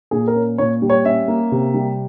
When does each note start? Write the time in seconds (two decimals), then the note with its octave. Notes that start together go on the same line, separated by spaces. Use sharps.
0.11 A#2 G#4
0.27 A#4
0.35 C#4
0.58 A#2 C#5
0.82 G3
0.90 C#5
1.04 C#4 E5
1.28 A#3
1.52 C3
1.74 G3